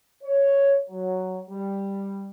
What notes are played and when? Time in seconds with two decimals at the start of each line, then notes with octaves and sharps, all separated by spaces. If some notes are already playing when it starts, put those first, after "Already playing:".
0.22 C#5
0.89 F#3
1.48 G3